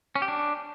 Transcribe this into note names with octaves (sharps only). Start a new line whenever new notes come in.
C#4
G4
D4